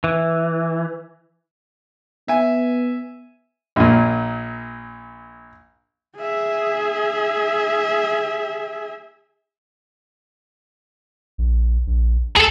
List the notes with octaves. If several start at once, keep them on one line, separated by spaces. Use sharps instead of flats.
E3
B3 E5 G#5
A#1 A#2
G#4 E5
A#1
A#1
D2 G#4 A4